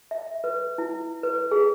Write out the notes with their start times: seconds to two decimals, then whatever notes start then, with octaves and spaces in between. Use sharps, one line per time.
0.11 E5
0.44 B4
0.78 E4
1.23 B4
1.52 G#4